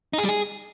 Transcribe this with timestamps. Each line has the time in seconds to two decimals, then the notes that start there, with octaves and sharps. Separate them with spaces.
0.13 D#4
0.19 G#4
0.24 G3
0.29 G#4